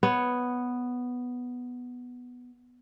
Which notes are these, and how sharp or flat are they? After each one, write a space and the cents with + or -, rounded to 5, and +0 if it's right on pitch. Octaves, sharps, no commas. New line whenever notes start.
B3 +0 C#5 +0